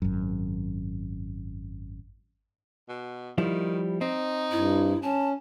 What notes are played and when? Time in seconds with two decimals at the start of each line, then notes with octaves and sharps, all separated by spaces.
0.02 G#1 F#2
2.89 B2
3.38 D#3 F3 G3 E4
4.01 C4 D#4
4.51 G2 E4
5.02 C#4 A5